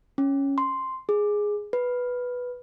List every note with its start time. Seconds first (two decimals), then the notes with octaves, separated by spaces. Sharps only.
0.18 C#4
0.58 C6
1.09 G#4
1.73 B4